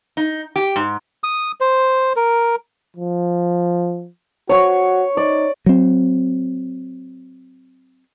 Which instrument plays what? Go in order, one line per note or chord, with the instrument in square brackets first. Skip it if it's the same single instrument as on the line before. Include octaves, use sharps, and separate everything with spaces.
[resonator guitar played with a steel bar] D#4
G4
G#2
[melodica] D#6
C5
A#4
[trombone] F3
[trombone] F#4 [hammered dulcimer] C#5 C#6
[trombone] D#4 [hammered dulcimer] D5
[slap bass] F#3 C4